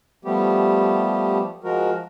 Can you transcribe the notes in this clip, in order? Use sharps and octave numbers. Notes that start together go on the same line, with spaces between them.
F3 G3 A3 B3 G4
F3 G#3 F#4 A#4